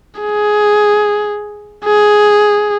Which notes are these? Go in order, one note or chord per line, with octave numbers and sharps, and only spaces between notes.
G#4
G#4